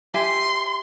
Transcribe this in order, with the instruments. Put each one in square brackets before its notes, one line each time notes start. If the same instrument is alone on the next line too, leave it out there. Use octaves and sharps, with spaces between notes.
[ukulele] G4 E5 G#5 [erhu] C6